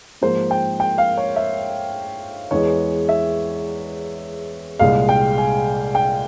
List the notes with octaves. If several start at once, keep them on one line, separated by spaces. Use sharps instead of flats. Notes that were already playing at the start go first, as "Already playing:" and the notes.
G#2 F3 A#3 C5
G5
G5
F5
C#5
E5
E2 E3 G#3 C#5
E5
C2 A#2 G#3 F5
G5
G#5
G5